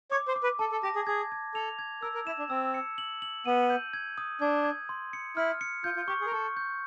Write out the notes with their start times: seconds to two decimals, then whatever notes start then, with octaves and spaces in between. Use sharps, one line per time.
0.11 C#5 D6
0.28 C5
0.36 D6
0.43 B4
0.59 A4 A5
0.72 A4
0.83 G4 A#6
0.95 G#4
1.07 G#4 G#6
1.32 G#6
1.54 A4 F7
1.79 G#6
2.02 A#4 E6
2.15 A#4
2.27 E4 E7
2.39 D4
2.50 C4 E6
2.74 C#7
2.98 F#7
3.22 F#7
3.46 B3 D#7
3.70 G6
3.94 G#6
4.18 D#6
4.41 D4 G#6
4.65 G#6
4.89 C6
5.13 C#7
5.37 E4 F6
5.61 C#7
5.84 F4 G6
5.96 F4
6.08 G4 C#6
6.21 G#4
6.26 A#4
6.32 A4 C#6
6.57 G6